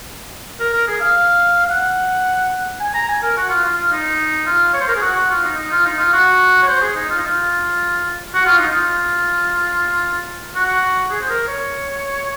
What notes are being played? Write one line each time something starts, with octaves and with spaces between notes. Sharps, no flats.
A#4
A#4
G#4
F5
F5
F#5
G#5
A#5
G#5
A#4
F#4
F4
F4
F4
D#4
F4
C#5
C5
A#4
G#4
F#4
F#4
F4
D#4
D#4
F4
D#4
F4
F#4
C#5
C5
G#4
D#4
F4
D#4
F4
F#4
F4
D#4
F4
F#4
G#4
C5
A#4
C#5